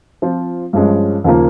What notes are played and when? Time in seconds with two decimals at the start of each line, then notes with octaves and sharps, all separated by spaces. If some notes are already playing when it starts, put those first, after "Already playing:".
0.22 F3 C4 F4 C5
0.73 G2 F3 G#3 C#4
1.24 D#2 C#3 F3 A#3 F4